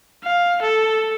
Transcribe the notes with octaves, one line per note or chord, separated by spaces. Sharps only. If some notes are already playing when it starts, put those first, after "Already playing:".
F5
A4